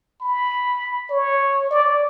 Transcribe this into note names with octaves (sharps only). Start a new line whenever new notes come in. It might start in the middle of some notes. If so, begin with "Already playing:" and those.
B5
C#5
D5